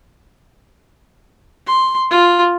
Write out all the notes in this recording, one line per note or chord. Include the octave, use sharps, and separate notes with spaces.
C6
F4